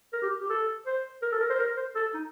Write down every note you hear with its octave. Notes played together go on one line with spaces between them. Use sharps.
A#4
G4
G4
A4
C5
A#4
A4
A#4
C5
A#4
C5
A4
D#4